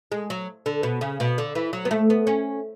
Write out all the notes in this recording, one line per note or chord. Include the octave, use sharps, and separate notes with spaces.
G#3
F#3
D3
B2
C#3
B2
D3
E3
F#3
B3
A3
B3
C#4